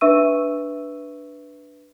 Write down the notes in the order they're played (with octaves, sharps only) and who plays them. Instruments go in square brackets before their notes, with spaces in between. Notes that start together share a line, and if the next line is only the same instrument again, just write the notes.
[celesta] D4 B4 E5 C#6 E6 D#7